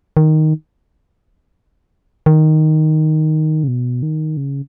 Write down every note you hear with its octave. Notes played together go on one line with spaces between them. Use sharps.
D#3
D#3
C#3
B2
D#3
C#3